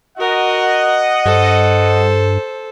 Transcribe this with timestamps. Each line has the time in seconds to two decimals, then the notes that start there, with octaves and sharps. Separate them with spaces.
0.18 F#4 A#4 D#5 F#5
1.25 G2 A4 C5